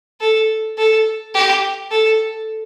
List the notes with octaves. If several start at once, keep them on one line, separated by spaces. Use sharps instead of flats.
A4
A4
G4
A4